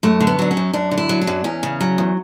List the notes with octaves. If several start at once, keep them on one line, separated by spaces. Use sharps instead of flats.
F#2 A3
D3
B3
F#3 D4
C#4
F#2
F#2 D4
D3
E4
F#3
D4
F#2
E2 C#4
C#3
F#3
E2